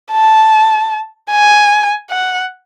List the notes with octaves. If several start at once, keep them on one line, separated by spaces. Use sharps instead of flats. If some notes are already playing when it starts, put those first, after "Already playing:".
A5
G#5
F#5